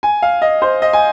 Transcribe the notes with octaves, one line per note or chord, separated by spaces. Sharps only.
G#5
F5
D#5
C5
D#5
G#5